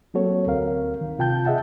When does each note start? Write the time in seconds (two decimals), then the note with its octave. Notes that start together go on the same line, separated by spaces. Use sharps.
0.14 F#3 A#3 C4 F#4 A4 C#5
0.47 D2 C4 A#4 F5
1.01 D#3
1.19 C3 F4 G5 A5 G6
1.45 G#4 D#5 E5 F#5 A5